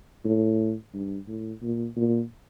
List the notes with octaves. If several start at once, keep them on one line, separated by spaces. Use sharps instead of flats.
A2
G2
A2
A#2
A#2